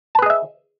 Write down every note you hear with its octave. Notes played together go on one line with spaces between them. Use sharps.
G#4 B4 D#5 E5 A5